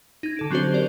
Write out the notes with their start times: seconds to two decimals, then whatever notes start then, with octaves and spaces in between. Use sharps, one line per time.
0.23 D#4 G#6
0.37 D3 A4 D7
0.51 F#3 C4 D4 F#4 G4 C5
0.74 A#4 D5